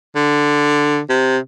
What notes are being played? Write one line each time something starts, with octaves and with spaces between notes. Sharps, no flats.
D3
C3